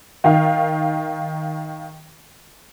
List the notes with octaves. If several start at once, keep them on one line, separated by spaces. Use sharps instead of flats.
D#3 F5